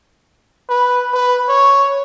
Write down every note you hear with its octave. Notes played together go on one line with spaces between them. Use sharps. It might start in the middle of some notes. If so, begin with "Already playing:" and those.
B4
B4
C#5